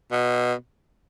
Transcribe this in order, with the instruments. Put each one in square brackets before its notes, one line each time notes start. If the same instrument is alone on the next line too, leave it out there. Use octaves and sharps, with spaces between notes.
[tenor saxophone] B2